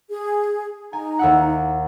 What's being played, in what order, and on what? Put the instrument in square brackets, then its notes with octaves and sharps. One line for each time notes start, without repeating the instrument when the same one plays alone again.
[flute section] G#4
[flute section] D#4 A#5 [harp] G#5
[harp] D#2 E4 F#5